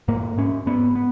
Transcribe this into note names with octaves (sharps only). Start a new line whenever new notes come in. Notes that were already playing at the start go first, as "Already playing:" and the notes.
G#2 A#3
G#2 C#4
G#2 B3
B3